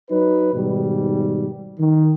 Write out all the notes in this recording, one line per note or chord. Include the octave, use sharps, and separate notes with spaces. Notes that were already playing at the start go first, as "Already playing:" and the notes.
F#3 D#4 B4
G#2 B2 D#3 G3
D#3